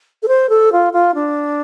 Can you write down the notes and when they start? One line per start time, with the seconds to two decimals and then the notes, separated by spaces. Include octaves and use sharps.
0.23 A4
0.28 C5
0.49 A4
0.72 F4
0.93 F4
1.15 D4